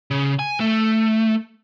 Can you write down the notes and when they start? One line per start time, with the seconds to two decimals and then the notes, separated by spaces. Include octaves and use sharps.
0.11 C#3
0.39 G#5
0.60 A3